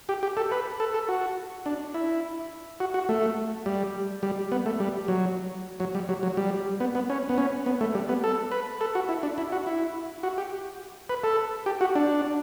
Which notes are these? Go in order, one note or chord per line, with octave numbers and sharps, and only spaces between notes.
G4
G4
A4
B4
A4
A4
F#4
D4
E4
F#4
F#4
A3
G3
G3
B3
A3
G3
F#3
F#3
G3
F#3
F#3
G3
B3
B3
C#4
B3
C#4
B3
A3
G3
B3
A4
B4
A4
F#4
E4
D4
E4
F#4
E4
F#4
G4
B4
A4
G4
F#4
D4